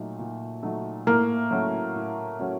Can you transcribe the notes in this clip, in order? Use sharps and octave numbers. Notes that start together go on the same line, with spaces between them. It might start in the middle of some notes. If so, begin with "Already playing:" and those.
Already playing: A#2 F#3 A3 D#4
A#2
F#3 A3 D#4
A2 A#3
F#3 A3 C#4 F#4
A2
F#3 A3 C#4 F#4